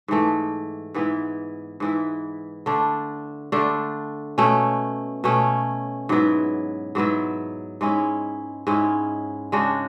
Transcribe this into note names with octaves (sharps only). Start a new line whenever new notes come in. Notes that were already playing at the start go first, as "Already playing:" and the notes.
G#2 E3 A3
G#2 E3 B3 E4
G#2 E3 B3 E4
D3 A3 D4
D3 A3 D4
B2 A3 C#4
B2 A3 C#4
G#2 F#3 B3 E4
G#2 F#3 B3 E4
G#2 G#3 C#4 E4
G#2 G#3 C#4 E4
C#3 G#3 D4 F#4